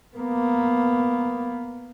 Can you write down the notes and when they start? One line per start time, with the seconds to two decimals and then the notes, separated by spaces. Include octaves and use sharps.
0.17 A#3 B3